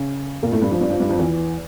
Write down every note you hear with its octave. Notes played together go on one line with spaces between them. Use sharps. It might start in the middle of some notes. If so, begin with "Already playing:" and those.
Already playing: C#3 C#4
A#2 A#3
A2 A3
G2 G3
F2 F3
G2 G3
F2 F3
G2 G3
F2 F3
E2 E3